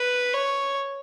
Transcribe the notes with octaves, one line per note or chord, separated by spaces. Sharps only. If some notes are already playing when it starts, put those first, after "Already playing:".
Already playing: B4
C#5